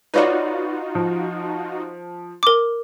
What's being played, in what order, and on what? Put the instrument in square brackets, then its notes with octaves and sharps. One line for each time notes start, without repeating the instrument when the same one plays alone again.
[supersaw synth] D#4 F4 F#4 [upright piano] B4 C#5 D5
[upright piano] F3
[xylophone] A#4 D6